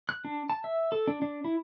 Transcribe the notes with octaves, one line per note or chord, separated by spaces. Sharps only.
F#6
D4
A5
E5
A4
D4
D4
E4